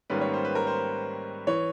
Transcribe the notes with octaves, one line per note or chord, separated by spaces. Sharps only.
G#2 D#3 G3 A#3 C#4 B4
C#5
C5
B4
A#4
C5
E3 C#5